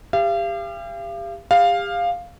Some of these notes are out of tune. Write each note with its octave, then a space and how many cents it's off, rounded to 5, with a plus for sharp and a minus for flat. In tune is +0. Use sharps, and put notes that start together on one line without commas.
G4 +30 F5 -40
G4 +40 F5 +0